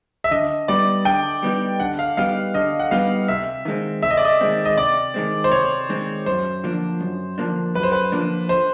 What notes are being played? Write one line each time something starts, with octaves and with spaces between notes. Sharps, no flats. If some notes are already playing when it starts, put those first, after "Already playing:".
E5
D3 D#5
G3 B3 D#4 G4 D5
D3 G5
G3 B3 D#4 G4
D3 F#5
F5
G3 B3 D#4 G4 F5
D3 D#5
F#5
G3 B3 D#4 G4 F5
C3 E5
D#3 G#3 C4
C3 E5
D#5
D5
D#5
D#3 G#3 C4
D#5
C3 D5
D#3 G#3 C4
C5
C3 C#5
D#3 G#3 C4
F#2 C5
D3 F3 A#3 D4
F#2
D3 F3 A#3 D4
F#2 B4
C5
B4
D3 F3 A#3 D4
C5